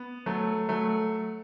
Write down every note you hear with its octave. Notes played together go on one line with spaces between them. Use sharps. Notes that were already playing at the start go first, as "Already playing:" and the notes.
Already playing: B3
F#3 A3
F#3 A3